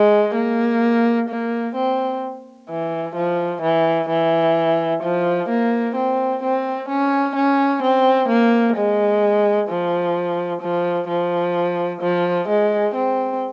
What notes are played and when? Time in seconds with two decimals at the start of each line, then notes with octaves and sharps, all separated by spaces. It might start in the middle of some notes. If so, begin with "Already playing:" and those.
Already playing: G#3
0.35 A#3
1.29 A#3
1.75 C4
2.70 E3
3.15 F3
3.62 E3
4.09 E3
5.03 F3
5.49 A#3
5.96 C4
6.43 C4
6.89 C#4
7.36 C#4
7.83 C4
8.28 A#3
8.76 G#3
9.69 F3
10.62 F3
11.08 F3
12.02 F3
12.48 G#3
12.95 C4